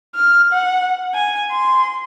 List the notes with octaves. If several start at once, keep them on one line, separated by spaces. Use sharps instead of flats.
F6
F#5
G#5
C6